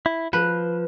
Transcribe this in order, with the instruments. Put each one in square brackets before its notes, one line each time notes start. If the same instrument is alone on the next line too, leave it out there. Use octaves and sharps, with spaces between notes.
[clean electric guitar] E4
[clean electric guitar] F3 [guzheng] B4